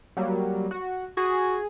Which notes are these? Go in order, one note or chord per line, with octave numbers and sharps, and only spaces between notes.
F#3 G3 A#3
F#4
F#4 G#4